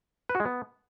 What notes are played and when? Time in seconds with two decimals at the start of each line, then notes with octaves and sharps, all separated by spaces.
0.29 B4
0.35 F#4
0.40 G#3
0.45 B3